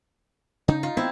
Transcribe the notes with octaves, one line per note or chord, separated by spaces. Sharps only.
C#3 D#4
F4
B3 C4 E4